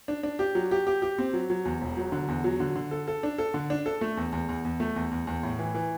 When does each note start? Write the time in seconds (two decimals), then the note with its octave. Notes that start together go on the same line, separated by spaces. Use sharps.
0.08 D4
0.23 D4
0.39 G4
0.55 F#3
0.71 G4
0.87 G4
1.02 G4
1.18 C4
1.33 F#3
1.50 F#3
1.65 E2
1.81 E1
1.97 F#3
2.12 D3
2.28 E2
2.44 F#3
2.60 D3
2.75 D3
2.91 A4
3.08 A4
3.23 D4
3.38 A4
3.54 D3
3.70 D4
3.86 A4
4.01 A3
4.17 E2
4.32 E2
4.49 E2
4.65 E2
4.80 A3
4.96 E2
5.11 E2
5.27 E2
5.43 A2
5.59 E3
5.75 E3